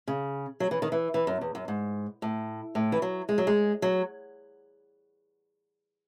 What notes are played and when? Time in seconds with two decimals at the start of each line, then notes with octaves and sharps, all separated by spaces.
0.08 C#3
0.60 F#3
0.71 E3
0.82 D#3
0.92 E3
1.14 E3
1.27 F#2
1.41 E2
1.55 F#2
1.68 G#2
2.22 A2
2.75 A2
2.92 E3
3.02 F#3
3.29 G#3
3.38 F#3
3.47 G#3
3.82 F#3